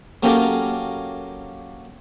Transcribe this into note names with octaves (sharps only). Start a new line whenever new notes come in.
F#3 A#3 C#4 G4 A4 A#4